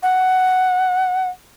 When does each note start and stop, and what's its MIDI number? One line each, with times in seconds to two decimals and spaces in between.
0.03 1.28 78